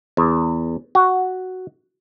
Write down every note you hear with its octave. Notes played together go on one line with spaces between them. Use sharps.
E2
F#4